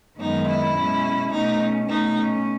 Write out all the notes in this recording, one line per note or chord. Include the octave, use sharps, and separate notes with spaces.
F#2 D#3 G#3 B3 D#4
E4
B2 G#3 C#4
B2 A3 C#4 D#4
C#4
B2 A3 C#4 D#4
C#4